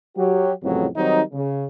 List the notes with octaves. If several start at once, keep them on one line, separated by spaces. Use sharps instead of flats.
F#3 G4
C2 F2 A2 C#3 E3 F#3
D#3 F#3 G3 C4 D#4
C#3